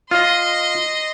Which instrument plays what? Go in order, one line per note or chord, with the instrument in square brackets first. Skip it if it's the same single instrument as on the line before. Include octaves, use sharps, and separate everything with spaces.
[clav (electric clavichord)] F4 [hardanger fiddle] D#5 C6